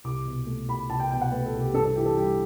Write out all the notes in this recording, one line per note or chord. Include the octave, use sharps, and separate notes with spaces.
C2 D6
B2
A3
C2 B5
C2 A5
G5
B2 G5
F#5
A3 B4
A4
C2
G4
G2 A4
A4
E3 G4
A4
G3 G4